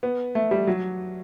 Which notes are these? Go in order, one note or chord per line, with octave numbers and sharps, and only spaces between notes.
B3
A3
G3
F#3